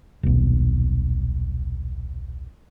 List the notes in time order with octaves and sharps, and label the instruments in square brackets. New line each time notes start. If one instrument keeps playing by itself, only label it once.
[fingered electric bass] D#1 B1